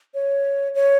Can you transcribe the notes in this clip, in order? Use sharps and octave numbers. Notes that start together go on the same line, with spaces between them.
C#5
C#5